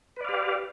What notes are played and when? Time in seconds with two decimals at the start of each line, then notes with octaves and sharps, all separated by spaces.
0.17 B4
0.21 D5
0.25 F5
0.29 G4